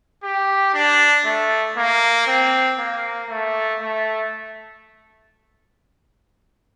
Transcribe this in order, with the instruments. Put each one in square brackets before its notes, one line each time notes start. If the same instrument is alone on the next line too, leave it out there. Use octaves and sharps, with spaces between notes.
[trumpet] G4
D4
A3
A#3
C4
A#3
A3
A3